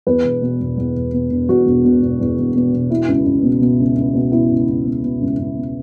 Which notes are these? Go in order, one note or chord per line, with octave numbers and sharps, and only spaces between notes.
E2 B4
E1
B2
E1
E2
E1
B2
E1
E2 F#4
E1
B2
E1
E2
E1
B2
E1
B2 E4
C#2
C#2
B2
B2
C#2
C#2
B2
B2 E4
C#2
C#2
B2
B2
C#2
C#2
B2